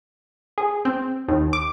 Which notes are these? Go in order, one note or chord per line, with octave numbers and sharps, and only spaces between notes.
G#4
C4
D#2
D6